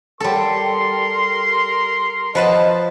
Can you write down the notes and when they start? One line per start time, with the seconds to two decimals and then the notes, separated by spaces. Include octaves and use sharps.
0.20 G3 A4 A#4 C6
2.35 F3 B4 D#5 A5